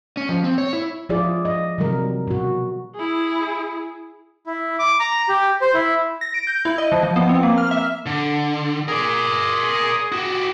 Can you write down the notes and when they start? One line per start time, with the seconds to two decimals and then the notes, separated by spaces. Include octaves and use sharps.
0.17 C#4
0.29 F3
0.44 C4
0.58 C#5
0.73 E4
1.09 F3 E4 F4 G#4 D5
1.45 D#5
1.78 C3 D#3 F#3 G3 A#4
2.28 B2 F#4
2.95 E4 G#4
4.46 E4
4.79 D6
5.00 A#5
5.29 G4
5.61 C5
5.74 E4
6.21 A#6
6.34 D7
6.47 G6
6.65 E4
6.78 D#5
6.92 F3
7.03 F3
7.16 B3
7.29 C4
7.43 A#3
7.58 F6
7.71 E5
8.06 D3
8.88 G#4 A#4 D5
10.12 F#4 G4